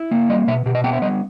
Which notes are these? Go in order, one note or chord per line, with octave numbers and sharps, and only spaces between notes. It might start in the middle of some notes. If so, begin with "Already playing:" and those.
Already playing: E4
A#3
G3 D#5
B2 E5
B2 G4
D#5
B3 G5
E5
G3 D#5